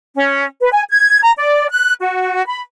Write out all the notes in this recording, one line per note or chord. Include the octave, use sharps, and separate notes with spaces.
C#4
B4
G#5
G#6
A#5
D5
F#6
F#4
B5